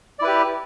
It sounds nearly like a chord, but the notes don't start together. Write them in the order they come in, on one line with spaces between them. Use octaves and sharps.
D5 E4 B4 G4